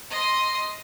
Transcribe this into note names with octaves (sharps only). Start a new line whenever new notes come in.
D#5 C6